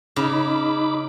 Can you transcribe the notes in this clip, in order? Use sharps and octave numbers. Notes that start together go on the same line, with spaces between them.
C#3 D#4 B5 D6